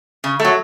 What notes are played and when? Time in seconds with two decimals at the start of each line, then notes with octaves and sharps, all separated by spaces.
0.24 C#3
0.40 F#3 A3